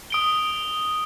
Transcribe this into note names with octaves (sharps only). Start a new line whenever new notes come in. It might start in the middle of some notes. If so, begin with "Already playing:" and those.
D#6 D7 G7